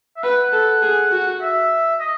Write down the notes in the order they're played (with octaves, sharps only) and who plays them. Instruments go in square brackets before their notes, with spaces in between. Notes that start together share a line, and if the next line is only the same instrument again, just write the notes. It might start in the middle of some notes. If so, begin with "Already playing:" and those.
[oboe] E5
[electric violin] B4 [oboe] F#5
[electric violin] A4
G#4
F#4
[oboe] E5
D#5